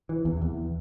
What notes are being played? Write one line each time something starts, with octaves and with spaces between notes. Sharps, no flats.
E3
E2
E2